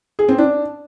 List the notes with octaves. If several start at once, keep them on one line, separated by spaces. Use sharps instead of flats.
G#4
C4
D4